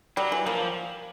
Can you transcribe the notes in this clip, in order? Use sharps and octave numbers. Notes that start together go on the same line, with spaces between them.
F#3 G3
E3
F3 A#3